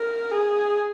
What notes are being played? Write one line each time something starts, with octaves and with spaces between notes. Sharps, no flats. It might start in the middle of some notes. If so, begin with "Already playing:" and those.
Already playing: A#4
G#4